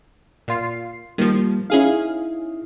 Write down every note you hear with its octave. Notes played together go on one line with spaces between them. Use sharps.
A#2 F4 C7
D#3 F3 G3 A#3
C#4 D#4 E4 G#4 F5